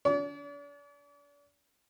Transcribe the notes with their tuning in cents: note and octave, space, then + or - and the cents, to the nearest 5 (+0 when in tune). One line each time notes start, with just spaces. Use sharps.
D4 -40 D5 -45